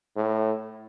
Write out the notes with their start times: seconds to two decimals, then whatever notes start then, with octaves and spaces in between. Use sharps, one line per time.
0.16 A2